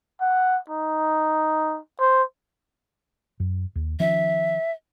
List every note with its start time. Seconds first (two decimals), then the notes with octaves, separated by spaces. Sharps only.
0.21 F#5
0.70 D#4
2.00 C5
3.40 F#2
3.75 D#2
4.00 D#3 F3 C#4 E5